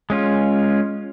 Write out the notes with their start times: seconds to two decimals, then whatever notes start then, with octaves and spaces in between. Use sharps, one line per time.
0.10 G#3 C#4 F4